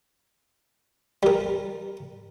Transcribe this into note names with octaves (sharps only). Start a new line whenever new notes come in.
G3 A#4